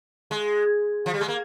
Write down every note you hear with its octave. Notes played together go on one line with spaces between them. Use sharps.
G#3
F3
G3
G#3
A#3